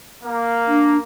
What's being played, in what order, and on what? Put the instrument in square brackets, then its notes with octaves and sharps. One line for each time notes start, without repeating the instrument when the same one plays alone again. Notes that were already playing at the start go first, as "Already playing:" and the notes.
[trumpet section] A#3
[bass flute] D4